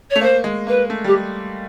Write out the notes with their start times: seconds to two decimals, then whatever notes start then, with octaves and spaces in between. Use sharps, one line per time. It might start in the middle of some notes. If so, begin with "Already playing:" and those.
0.10 C#5
0.16 A3
0.21 A#3 C5
0.44 G#3
0.67 A#3 B4
0.90 A3
1.04 G3 G4